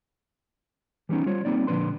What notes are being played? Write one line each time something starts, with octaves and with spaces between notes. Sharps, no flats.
E3 G3 B3 C#4 D#4
G3 F4 C5 C#5
G3 A#3 C4 D#4 D5
A#2 D3 F3 D4 B4 C6